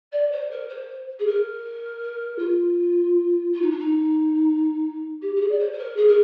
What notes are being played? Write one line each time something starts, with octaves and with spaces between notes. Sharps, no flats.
D5
C5
A#4
C5
G#4
A#4
F4
F4
D#4
D4
D#4
G4
G4
G#4
D5
C5
C5
A#4
G#4
A#4